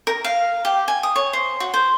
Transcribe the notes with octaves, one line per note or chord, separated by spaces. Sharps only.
A#4
F5
G4
G#5
D#6
C#5
C5
F#4
C5